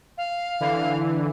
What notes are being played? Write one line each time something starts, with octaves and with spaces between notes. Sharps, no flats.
F5
D3 E3